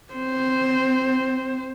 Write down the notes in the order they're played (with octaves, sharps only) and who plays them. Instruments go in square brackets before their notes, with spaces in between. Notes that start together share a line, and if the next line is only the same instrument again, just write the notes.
[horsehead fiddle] C4 C5